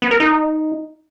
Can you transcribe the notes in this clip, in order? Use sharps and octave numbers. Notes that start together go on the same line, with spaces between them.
B3
A#4
D#4